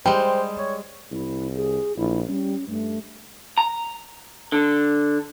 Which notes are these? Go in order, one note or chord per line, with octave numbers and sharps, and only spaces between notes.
G3 G#3 C5 G5
C#5
C2 E4
G#4
A#1 E4
G3 C#4
G2 A3
A#5
D3